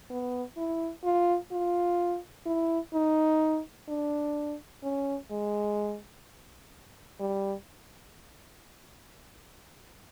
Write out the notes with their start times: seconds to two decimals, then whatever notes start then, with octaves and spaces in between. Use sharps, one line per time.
0.10 B3
0.57 E4
1.04 F4
1.52 F4
2.46 E4
2.94 D#4
3.88 D4
4.83 C#4
5.31 G#3
7.20 G3